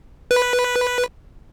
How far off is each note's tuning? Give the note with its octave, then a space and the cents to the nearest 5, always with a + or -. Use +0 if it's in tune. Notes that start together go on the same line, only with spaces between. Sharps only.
B4 -5